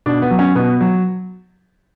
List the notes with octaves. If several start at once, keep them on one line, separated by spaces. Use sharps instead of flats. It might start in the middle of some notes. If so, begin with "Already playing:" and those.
B2 D4
B3
F#3
C#4
B2 B3
F#3